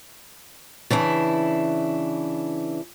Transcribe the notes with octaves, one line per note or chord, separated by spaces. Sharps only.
C#3 E3 D4 E4